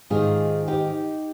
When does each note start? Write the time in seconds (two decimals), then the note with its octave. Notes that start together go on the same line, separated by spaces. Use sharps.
0.10 G#2 D#3 F4 G#4
0.68 D#4 G4